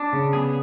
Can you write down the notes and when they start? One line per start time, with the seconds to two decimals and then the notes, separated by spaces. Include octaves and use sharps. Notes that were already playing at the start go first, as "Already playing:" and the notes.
Already playing: D4
0.13 C#3
0.33 B3 G#4